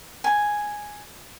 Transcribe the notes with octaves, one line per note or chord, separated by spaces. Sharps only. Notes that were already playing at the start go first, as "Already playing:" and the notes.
G#5